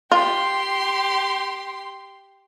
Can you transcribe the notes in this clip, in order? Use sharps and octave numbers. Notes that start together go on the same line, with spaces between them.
F4 G4 C6